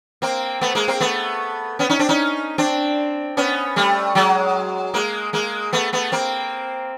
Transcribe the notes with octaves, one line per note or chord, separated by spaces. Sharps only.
A#3 C4
A3 B3
G#3 A#3
A#3 C4
A3 B3
B3 C#4
C#4 D#4
C4 D4
C#4 D#4
C4 D4
B3 C#4
G3 A3
F#3 G#3
G#3 A#3
G#3 A#3
A3 B3
A3 B3
A#3 C4